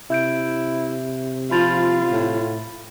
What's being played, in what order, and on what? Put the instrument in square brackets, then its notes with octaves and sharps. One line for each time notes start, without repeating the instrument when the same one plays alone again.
[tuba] C3 [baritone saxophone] E4 [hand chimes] E5 G6 D7
[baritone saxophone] F3 [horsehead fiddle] F4 [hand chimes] B5 A6
[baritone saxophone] A2